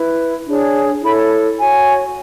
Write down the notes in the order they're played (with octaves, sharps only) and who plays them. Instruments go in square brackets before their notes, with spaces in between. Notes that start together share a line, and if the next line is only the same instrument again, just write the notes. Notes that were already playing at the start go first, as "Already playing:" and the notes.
Already playing: [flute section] E4 B4
D4 G#4 C#5
E4 A4 C#5 B5
F#4 C#5 G#5